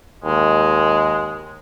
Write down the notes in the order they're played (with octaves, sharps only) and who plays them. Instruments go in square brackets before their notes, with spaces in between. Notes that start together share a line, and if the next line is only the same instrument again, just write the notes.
[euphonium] D#2 [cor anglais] G#3